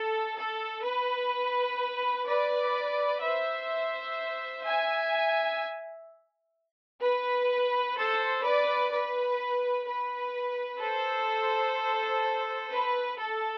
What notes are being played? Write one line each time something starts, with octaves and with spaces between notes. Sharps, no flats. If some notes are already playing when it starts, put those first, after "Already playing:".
Already playing: A4
A4
B4
B4 D5
C5 E5
E5 G#5
B4
A4 C5
B4 D5
B4
B4
A4 C5
B4
A4